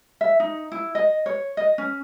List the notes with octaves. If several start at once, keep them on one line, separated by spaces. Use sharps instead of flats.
E5
D#4
E4
D#5
C#5
D#5
C#4